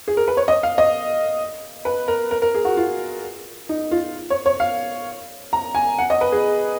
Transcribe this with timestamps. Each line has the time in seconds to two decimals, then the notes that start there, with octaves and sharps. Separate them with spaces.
0.08 G#4
0.17 A#4
0.28 B4
0.37 C#5
0.48 D#5
0.63 F5
0.78 D#5
1.85 B4
2.08 A#4
2.31 A#4
2.42 A#4
2.55 G#4
2.65 F#4
2.77 F4
3.69 D#4
3.91 F4
4.30 C#5
4.46 C#5
4.60 F5
5.53 A#5
5.75 G#5
5.98 F#5
6.10 D#5
6.21 B4
6.32 G#4